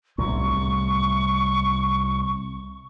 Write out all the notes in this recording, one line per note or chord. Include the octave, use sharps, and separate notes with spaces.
C2 A2 C#6